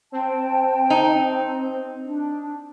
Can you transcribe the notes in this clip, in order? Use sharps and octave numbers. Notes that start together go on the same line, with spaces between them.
C4 G5 A5
D#4
D4